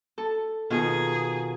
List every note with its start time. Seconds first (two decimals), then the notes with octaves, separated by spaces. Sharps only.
0.18 A4
0.70 B2 D#3 F4 G#4